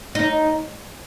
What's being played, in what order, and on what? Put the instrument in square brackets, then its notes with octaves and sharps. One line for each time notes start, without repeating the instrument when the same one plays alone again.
[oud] D#4